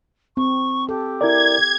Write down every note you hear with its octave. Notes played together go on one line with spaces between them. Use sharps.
C4 C#6
G4 A4
E4 A#4 D5 G#6